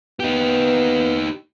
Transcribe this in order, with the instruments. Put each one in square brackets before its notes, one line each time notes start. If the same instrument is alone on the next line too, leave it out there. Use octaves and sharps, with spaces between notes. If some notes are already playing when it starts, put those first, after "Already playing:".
[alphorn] B3 [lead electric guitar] D#4 G4